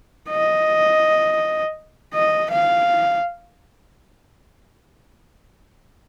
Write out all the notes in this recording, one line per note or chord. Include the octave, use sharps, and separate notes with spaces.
D#5
D#5
F5